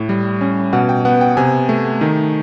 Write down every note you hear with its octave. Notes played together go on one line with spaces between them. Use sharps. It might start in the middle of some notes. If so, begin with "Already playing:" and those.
Already playing: A2
G3
C#4
B2 F#5
G5
B3 F#5
G5
C3 G#5
A3
D#3